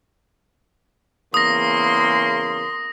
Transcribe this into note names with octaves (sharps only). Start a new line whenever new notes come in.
E2 C#3 A#3 C6 D#6 A#6